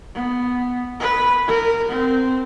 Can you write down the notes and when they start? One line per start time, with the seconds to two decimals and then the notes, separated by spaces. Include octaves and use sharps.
0.15 B3
1.00 B4
1.48 A#4
1.89 C4